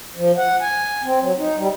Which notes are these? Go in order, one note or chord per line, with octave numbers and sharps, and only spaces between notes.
F3
F#5
G#5
C4
F#3
D#4
G3